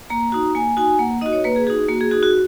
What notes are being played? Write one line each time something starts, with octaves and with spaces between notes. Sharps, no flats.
A#3 A#5
D#4 F#4
A#3 G#5
D#4 F#4 G#5
A#3 F#5
D#4 F#4 D#5
C#5
A#3 B4
G#4
D#4 F#4 G#4
A#3 F#4
G#4
D#4 F#4 G#4
F#4